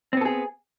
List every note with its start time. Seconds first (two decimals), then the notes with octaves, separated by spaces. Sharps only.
0.13 C4
0.17 B3
0.21 A4
0.25 G#4